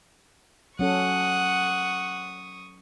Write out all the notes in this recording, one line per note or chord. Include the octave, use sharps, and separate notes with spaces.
F#3 C#4 A4 F#5 C#6 D#6